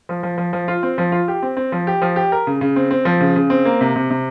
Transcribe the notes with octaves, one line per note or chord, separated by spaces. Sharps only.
F3
F3
F3
F3
F4
C4
F3
F4
G4
C4
C4
F3
G4
F3
G4
A#4
C#3
C#3
C4
C4
F3
C#3
C#3
C4
A#3
C3
C3
C3